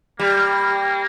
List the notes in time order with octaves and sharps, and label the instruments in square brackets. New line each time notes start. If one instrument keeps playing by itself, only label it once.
[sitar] G3 [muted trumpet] A#3